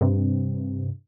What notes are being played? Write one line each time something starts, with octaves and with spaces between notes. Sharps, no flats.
G2 C3